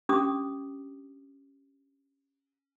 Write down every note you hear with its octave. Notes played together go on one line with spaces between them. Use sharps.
C#4 D4 G4 D6 D#6